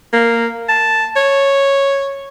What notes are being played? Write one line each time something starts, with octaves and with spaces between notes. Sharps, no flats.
A#3
A5
C#5